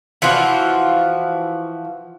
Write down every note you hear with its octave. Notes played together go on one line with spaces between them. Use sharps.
E3 F3 F4 F#4